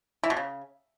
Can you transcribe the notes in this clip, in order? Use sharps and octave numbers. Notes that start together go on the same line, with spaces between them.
E3
B2
C#3